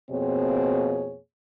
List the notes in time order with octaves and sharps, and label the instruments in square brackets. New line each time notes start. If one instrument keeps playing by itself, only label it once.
[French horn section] F2 B2 A#3 C4 G#4 C#5